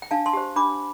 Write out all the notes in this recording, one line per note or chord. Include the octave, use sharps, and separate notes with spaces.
G5
D4 F5 A5
A5 C6
G4 C5
D4 B5 D6